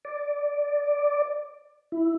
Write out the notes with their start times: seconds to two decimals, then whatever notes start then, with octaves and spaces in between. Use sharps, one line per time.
0.05 D5
1.92 E4